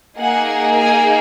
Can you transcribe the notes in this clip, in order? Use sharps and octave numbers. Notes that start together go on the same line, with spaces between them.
A#3 D#4 G#4 F#5
G#5